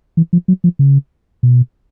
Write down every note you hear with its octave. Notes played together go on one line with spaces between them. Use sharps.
E3
F3
F#3
F3
C#3
B2